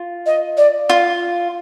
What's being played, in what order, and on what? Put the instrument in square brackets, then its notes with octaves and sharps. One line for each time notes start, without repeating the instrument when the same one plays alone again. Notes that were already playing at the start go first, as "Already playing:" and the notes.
Already playing: [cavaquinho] F4
[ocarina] D#5
D5
[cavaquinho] F4